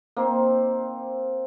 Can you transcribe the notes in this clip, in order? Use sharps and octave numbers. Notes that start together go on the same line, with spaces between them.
A#3 C4 D#4 C5